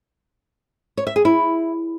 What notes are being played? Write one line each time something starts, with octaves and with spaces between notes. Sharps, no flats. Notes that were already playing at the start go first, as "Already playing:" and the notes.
C#5
E5
G#4
E4